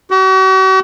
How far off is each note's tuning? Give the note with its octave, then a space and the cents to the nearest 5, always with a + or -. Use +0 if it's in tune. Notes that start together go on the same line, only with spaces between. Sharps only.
F#4 +45